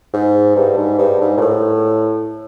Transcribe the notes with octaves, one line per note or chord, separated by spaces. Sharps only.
G#2
G2
G#2
G2
G#2
A#2
A2